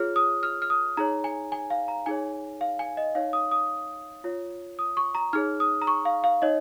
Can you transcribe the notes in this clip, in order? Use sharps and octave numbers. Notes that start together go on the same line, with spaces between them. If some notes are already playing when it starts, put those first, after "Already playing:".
Already playing: F4 G#4 C#5 F6
D#6
F6
F6
D#6
D#4 G#4 C#5 A#5
G#5
G#5
F5
A#5
D#4 G#4 C#5 G#5
F5
G#5
D#5
D#4 C#5 F5
D#6
D#6
F4 C#5
D#6
C#6
A#5
D#4 G#4 C#5 F6
D#6
A#5
C#6
F5
F5
D#4 C#5 D#5